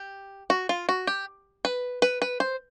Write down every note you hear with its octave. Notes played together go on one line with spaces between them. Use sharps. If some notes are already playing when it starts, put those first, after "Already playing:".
Already playing: G4
F#4
F4
F#4
G4
B4
B4
B4
C5